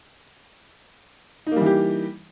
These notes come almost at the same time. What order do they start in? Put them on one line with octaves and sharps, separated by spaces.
D#4 A#3 G3 E3 G4